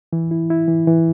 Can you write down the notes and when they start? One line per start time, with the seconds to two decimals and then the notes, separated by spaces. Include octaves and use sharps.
0.13 E3
0.31 E4
0.50 E4
0.68 E3
0.87 E3